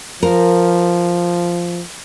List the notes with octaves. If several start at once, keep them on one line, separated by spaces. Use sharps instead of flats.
F3 A#4